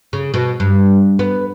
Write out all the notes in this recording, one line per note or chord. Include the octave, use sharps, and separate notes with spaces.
C#3
B2
G2
B3